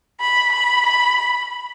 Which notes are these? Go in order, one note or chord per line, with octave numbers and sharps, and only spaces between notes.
B5
B5
B5